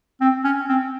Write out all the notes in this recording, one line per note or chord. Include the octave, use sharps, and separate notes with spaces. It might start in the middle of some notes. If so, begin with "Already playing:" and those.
C4
C#4
C4